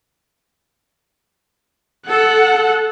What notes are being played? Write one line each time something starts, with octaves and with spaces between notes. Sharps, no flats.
A4 F#5